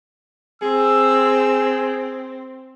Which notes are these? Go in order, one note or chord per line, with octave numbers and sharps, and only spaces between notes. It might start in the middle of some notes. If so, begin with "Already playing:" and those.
C4 G#4 E6